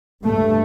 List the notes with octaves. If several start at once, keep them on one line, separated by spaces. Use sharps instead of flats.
G2 A3